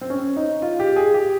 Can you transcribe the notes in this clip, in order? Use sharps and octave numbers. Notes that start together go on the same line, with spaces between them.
C4
C#4
D#4
F4
G4
G#4
G4